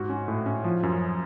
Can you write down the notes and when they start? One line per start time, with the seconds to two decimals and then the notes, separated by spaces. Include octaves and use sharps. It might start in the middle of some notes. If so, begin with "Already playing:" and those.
Already playing: G#2 F#4
0.09 C#4
0.28 A2
0.46 C#4
0.64 F3
0.83 F#2